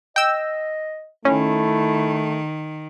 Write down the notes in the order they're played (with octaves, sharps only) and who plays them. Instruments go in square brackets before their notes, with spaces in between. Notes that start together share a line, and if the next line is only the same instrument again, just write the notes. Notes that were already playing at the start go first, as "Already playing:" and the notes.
[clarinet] D#5 [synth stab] G5 E6
[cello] D#3 [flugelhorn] A3 [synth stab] C#4 [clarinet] E4